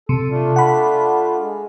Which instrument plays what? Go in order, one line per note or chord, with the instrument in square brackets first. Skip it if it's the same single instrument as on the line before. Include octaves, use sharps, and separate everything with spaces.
[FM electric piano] C3 [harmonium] A4
[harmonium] A3 D4 F4
[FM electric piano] F#5 B5
[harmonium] G#3